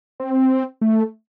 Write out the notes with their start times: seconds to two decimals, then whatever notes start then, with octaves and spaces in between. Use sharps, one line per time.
0.20 C4
0.81 A3